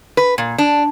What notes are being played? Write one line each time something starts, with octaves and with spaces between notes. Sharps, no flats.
B4
A#2
D4